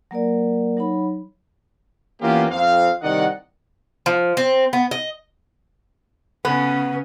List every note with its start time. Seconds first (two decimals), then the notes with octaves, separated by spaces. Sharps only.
0.11 F#3 A#3 A#4 D5
0.77 F#3 D#4 C#5 B5
2.22 E3 A#3 B3 C#4 F4 G4
2.50 F2 C4 F5
3.03 C2 D#3 D5 D#5 F#5
4.06 F3
4.37 C4
4.73 B3
4.91 D#5
6.45 C#3 B3 C#4